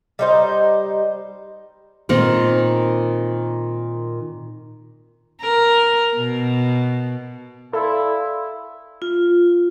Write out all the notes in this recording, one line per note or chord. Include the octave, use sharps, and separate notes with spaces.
G3 D#4 C5
A#2 D#3 C4
A#4
B2
E4 A4 D5 F5 C6
F4